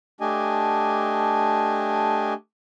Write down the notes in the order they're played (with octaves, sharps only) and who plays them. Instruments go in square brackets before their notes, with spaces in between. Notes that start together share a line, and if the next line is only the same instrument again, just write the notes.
[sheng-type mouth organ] A3 D4 G4 D#5 G#5